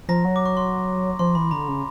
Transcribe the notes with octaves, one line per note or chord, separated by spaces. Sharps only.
F3 A#5 A#6
F#3
D6
C#6
C6
F3 C6
E3 B5
D3 A#5
C#3